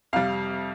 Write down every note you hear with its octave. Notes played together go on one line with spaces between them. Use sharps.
F2 C3 G3 F5